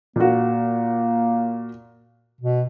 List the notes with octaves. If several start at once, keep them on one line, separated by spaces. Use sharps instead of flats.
A#2 A#3 F#4
B2